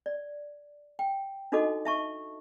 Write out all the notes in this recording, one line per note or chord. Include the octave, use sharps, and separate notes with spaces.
D5
G5
D4 D#4 F#4 A4 D#5 D6
E5 A5 C#6